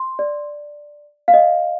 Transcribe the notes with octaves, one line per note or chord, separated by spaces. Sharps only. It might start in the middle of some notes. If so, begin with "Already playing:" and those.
Already playing: C6
D5
F5
D#5